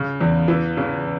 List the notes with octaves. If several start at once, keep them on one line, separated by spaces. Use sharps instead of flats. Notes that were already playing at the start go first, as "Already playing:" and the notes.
Already playing: C#3
E2
E3
C#3